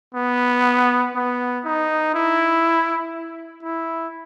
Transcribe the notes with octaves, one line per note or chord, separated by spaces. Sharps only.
B3
B3
D#4
E4
E4